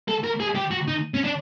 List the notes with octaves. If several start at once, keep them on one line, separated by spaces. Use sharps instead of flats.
A4
A#4
G#4
G4
F#4
D#4
C#4
D4